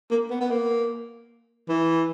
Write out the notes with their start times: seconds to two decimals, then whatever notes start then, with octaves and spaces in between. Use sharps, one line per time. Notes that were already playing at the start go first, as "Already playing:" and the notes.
0.11 A#3
0.30 B3
0.41 B3
0.51 A#3
1.69 E3